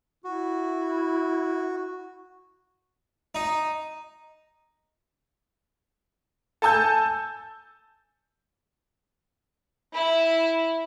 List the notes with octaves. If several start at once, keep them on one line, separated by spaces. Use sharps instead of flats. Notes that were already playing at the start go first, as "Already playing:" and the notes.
E4 F#4
D#4
A4 G#5 A5 E6 G6
E4